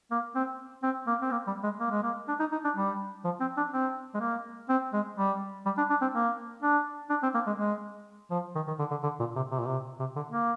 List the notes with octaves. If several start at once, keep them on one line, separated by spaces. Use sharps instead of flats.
A#3
C4
C4
A#3
C4
A#3
G3
G#3
A#3
G#3
A#3
D4
D#4
D#4
D4
G3
F3
C4
D4
C4
G#3
A#3
C4
G#3
G3
G3
D4
D4
C4
A#3
D4
D4
C4
A#3
G#3
G#3
F3
D#3
D#3
D3
D3
D3
A#2
C3
C3
A#2
C3
C3
D3
A#3